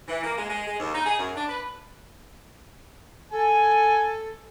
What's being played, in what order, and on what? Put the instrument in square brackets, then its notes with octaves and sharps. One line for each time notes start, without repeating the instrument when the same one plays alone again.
[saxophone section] E3
A#3
G#3
G#3
G#3
D#2
D#4
G#4
F#2
D4
B4
[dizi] A4 [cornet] G#5